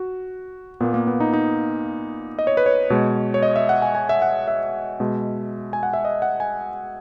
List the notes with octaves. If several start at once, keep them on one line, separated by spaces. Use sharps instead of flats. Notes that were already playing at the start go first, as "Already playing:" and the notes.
Already playing: F#4
A#2 A#3 B3
A#3
B3
D#4
D#4
D#5
C#5
B4
C#5
B2 G#3
C#5
D#5
E5
F#5
G#5
G#5
E5
F#5
E5
B2 G#3
G#5
F#5
E5
D#5
F#5
G#5